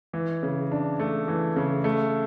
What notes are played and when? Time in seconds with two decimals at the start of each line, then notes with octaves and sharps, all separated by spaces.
0.13 E3
0.43 C#3
0.71 D4
0.99 A3
1.28 E3
1.56 C#3
1.84 A3